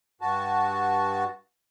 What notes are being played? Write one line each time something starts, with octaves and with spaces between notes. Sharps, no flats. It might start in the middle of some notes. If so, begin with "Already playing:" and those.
G2 F#4 A5